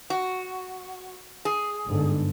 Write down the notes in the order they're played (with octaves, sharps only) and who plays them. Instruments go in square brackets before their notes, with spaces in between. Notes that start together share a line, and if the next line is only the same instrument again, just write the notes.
[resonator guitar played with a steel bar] F#4
G#4
[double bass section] G1 G#2 D3